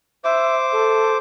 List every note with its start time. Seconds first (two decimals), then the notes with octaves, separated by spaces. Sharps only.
0.24 C5 E5 D6
0.72 A4